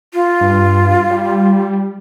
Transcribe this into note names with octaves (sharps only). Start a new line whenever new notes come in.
F4
G2
G3